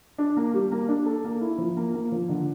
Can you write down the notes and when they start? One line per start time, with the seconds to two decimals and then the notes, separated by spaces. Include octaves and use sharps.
0.18 D4
0.37 A#3
0.54 G3
0.72 A#3
0.88 D4
1.06 A4
1.24 A#3
1.41 E4
1.58 F3
1.77 A#3
1.94 A#3
2.12 F3
2.29 D3